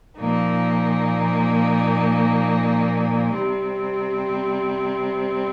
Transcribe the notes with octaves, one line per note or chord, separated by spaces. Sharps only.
A#2 F3 A#3 D#4
C3 G3 C4